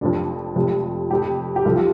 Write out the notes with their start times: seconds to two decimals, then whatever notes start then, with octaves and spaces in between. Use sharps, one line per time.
0.01 F1 F2 F3 D4
0.56 F1 F2 C3 F3
1.10 F1 F2 C3 G4
1.56 G4
1.65 C2 C3 F3 A4
1.75 F4